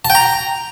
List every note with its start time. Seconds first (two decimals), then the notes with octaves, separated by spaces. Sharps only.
0.05 A5
0.10 G5
0.15 A#5